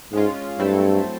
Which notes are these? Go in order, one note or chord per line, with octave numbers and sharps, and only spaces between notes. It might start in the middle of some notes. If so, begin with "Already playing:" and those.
G#2 G#3 C#4 F4
G2 F#3 A3 C4 E4 A4